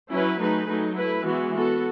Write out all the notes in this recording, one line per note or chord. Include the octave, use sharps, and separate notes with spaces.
F#3 C#4 E4 B4
F#3 A3 D#4 G#4 B4
F#3 A3 D#4
A3 E4 B4
E3 G#3 B3 F#4
B3 F#4 A4